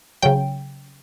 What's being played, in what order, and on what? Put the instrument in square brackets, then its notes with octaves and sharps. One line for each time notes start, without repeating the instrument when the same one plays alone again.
[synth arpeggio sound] C#3 F#3 G5